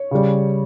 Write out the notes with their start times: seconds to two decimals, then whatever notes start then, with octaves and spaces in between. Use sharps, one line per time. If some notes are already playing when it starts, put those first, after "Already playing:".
Already playing: C#5
0.11 C#3 G3